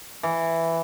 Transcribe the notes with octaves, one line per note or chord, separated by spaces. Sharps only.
E3